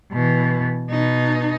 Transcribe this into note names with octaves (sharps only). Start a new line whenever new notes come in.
B2 E3
B2 D#4